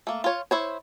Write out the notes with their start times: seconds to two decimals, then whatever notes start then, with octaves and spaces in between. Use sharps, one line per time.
0.07 A3 A#3
0.24 F4 C#5
0.51 E4 C5 C#5